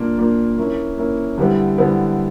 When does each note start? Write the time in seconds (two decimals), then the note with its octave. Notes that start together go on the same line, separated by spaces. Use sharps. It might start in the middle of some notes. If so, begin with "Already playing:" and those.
Already playing: A#2 A#3 D4 A#4
0.18 A#2 A#3 D4 A#4
0.57 A#3 C#4 E4
0.97 A#3 C#4 E4
1.38 D3 G3 B3 E4
1.77 D3 G3 B3 E4